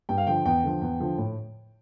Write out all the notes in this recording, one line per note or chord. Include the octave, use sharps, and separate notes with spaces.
G2 G5
F5
D3 F3 G5
E2 G5
D3 F3
E2
D3 F3
A2